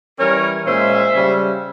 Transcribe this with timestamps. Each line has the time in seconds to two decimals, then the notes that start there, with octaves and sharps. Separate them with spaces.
0.19 E3 G3 C#4 A#4 C#5
0.66 A#2 G#3 C#4 C5 E5
1.14 C#3 G3 C#4